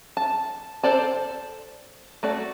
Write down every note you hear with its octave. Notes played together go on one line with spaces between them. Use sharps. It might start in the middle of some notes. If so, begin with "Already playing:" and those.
A5
A4 C5 D5 A5
A3 F#4 D5